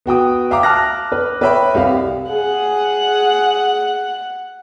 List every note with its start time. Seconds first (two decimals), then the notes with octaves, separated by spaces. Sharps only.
0.06 B3 F#4 G5 D#6
0.51 E5 F5 G5 A#5 D6
0.63 A5 F6 F#6 A#6
1.12 B4
1.41 B4 C#5 E5 G5 B5
1.74 C2 G4 F5
2.31 G#4 F#5